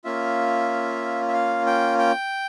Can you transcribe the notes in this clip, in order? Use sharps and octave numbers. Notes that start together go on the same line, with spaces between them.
A#3 C#4 F4 E5
E5
F5
G5
G5